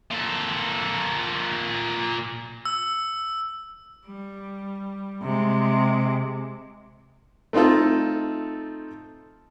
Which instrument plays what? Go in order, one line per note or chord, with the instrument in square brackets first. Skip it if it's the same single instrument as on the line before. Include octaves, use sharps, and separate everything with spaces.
[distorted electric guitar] A#2 A4
[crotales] E6
[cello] G3
C3 G#3
[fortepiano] A3 C4 D#4 F4 A4